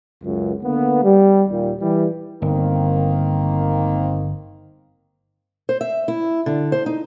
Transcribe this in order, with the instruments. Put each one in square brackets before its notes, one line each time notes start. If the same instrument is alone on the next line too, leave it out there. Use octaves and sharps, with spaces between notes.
[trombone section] C#2 F#2
D3 A#3 B3
G3
D#2 A#2 G3
E3 G3
[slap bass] G1 [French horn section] D#3 A#3 C4
[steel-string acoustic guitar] C5
E5
E4
D3
C5
D#4